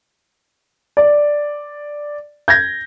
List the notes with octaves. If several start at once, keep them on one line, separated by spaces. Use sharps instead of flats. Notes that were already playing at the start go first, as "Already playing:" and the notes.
D5
G6 G#6 A#6